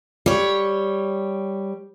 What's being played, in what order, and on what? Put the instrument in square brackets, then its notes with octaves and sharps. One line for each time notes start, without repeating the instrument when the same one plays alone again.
[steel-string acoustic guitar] G3 C#5